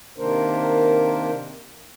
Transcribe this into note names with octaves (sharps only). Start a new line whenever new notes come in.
C3 D#3 A#3 D4 A#4 C5